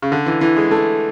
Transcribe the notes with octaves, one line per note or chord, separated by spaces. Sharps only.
C#3
D3
E3
E3
G#3
A3